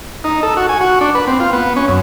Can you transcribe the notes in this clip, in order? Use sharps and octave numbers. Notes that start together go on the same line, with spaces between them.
D#4
A4
F#4
G#5
F#4
D4
B4
C4
F4
B3
C#4
F#2